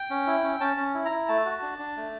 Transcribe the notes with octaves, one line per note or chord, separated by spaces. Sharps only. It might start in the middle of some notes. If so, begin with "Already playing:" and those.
Already playing: G5
C#4
E4
C#4
C#4 A5
C#4
E4
A#5
E4
A3 A5
F#4
D4
D4
A3